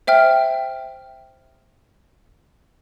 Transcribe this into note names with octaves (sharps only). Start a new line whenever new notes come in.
C5 E5 G5 F6